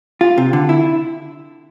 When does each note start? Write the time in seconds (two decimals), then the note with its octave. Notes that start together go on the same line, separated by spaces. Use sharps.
0.21 F4
0.38 C3
0.53 D3
0.69 E4